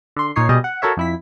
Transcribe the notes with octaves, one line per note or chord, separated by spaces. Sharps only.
D3 C6
A#2 D#4 C#5 C7
B2 G3 G#4 D#5
F#5
F#4 A4 A#4 C#5 E5
F2 E4 B6